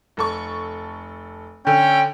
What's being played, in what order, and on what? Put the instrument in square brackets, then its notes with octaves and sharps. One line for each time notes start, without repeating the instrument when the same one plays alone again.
[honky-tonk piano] F1 A4 C#6
[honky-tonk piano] D3 [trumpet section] C#4 G5